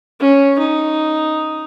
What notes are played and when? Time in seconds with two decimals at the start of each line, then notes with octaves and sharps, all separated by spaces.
0.20 C#4
0.59 D#4